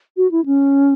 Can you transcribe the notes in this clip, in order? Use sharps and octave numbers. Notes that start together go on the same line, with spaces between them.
F#4
E4
C#4